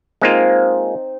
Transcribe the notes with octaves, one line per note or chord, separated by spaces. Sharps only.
G#3 A#3 C4 D#4 F4